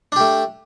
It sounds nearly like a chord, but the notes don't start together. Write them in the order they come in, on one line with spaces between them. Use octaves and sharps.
D4 G4 A3